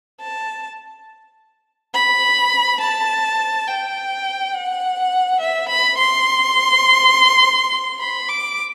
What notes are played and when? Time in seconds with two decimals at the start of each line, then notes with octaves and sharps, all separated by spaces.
0.21 A5
1.94 B5
2.80 A5
3.67 G5
4.53 F#5
5.40 E5
5.69 B5
5.98 C6
8.00 B5
8.29 D6